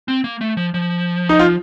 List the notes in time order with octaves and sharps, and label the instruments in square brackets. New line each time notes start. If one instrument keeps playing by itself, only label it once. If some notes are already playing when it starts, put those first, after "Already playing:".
[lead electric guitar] C4
A#3
A3
F3
F3
[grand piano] D#4
F4